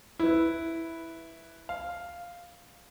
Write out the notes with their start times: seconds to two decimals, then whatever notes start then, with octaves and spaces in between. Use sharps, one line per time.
0.19 E4 B4
1.69 F5